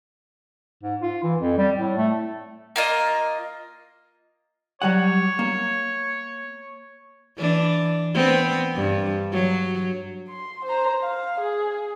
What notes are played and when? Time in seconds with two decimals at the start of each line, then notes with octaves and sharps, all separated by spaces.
0.83 G#2
1.02 F4
1.24 E3
1.39 F2
1.58 G3
1.77 A2
1.97 A3
2.76 A#3 F4 D#5
4.82 F#3 G3 C#5 F#5
5.39 A#3
7.38 E3 D4
8.14 B3 C4
8.75 G2
9.33 F#3
10.29 C6
10.65 C5 A#5
11.03 F5
11.40 G#4